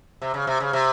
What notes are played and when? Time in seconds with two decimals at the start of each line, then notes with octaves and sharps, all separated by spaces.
0.22 C3
0.34 C#3
0.47 C3
0.60 C#3
0.73 C3